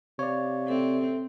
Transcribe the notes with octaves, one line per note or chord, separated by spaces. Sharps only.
C3 C#5 D5 F5
C4 A4 E5